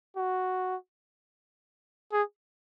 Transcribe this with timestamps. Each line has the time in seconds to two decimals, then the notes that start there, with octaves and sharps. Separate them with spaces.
0.16 F#4
2.13 G#4